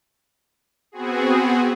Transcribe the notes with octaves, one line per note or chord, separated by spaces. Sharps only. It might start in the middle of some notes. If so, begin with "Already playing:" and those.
B3 C4 F#4 G#4